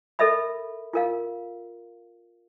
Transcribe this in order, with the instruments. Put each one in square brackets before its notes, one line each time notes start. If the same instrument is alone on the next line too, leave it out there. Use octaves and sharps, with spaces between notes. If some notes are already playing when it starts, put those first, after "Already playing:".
[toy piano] A4 A#4 D#5 E5 B5
F4 A#4 F5